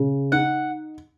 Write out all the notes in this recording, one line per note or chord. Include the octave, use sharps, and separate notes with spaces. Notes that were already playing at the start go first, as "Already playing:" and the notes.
Already playing: C#3
D#4 F#5